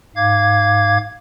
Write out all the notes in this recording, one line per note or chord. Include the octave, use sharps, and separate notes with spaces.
G#2 F5 D6 G#6